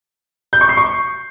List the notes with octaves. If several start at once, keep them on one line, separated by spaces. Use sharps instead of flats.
G6
C#6
C7
C#6